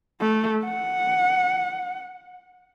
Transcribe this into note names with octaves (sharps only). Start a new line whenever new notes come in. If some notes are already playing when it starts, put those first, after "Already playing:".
A3
F#5